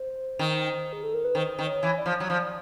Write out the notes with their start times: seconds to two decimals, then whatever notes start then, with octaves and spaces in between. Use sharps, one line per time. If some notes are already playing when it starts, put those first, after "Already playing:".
Already playing: C5
0.39 D#3
0.93 G#4
1.03 A4
1.14 A#4
1.25 B4
1.35 D#3 C5
1.59 D#3
1.66 C#5
1.83 E3
1.98 D5
2.06 F3
2.20 F#3
2.30 F3